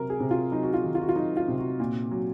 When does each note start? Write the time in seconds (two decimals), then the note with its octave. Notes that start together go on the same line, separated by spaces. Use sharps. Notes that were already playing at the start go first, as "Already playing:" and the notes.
Already playing: C3 F#3 A#4
0.10 G#4
0.20 C3
0.31 F4
0.52 F#3 D#4
0.63 F#4
0.74 F4
0.84 D#3
0.95 F4
1.01 F#4
1.09 F4
1.16 F#3 D#4
1.37 F4
1.48 C3
1.58 F#4
1.80 A#2
2.11 F#3